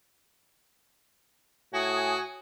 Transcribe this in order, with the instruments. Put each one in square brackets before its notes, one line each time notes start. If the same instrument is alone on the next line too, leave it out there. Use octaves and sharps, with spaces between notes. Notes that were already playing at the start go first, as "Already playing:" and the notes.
[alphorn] A2 [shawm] F#4 [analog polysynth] G#5 D#6